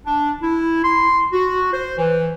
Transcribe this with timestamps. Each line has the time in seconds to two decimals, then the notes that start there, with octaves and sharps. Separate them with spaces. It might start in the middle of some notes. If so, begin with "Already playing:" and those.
0.05 D4
0.42 E4
0.84 C6
1.32 F#4
1.73 C5
1.98 E3